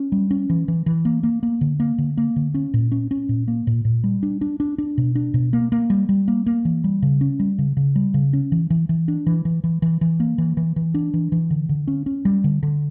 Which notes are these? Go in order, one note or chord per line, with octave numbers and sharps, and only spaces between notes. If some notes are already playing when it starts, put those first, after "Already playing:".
Already playing: C#4
G3
C#4
E3
E3
E3
A#3
A#3
A#3
D3
A#3
D3
A#3
D3
C#4
A#2
C#4
C#4
A#2
A#3
A#2
A#2
G3
D4
D4
D4
D4
B2
D4
B2
A#3
A#3
G3
G3
A#3
A#3
E3
G3
C#3
C#4
G3
C#3
C#3
G3
C#3
C#4
E3
E3
E3
D4
E3
E3
E3
E3
E3
A#3
E3
E3
E3
D4
E3
E3
D3
D3
C#4
C#4
G3
D3
D3